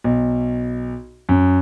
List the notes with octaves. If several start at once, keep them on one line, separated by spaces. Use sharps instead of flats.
B1
F#2